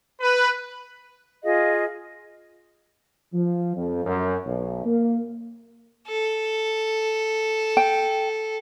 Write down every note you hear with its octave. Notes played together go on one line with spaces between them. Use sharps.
B4
F4 G#4 D#5 F5
F3
F2
F#2
B1
A#3
A4
G5